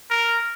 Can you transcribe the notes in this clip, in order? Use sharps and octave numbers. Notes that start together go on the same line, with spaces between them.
A#4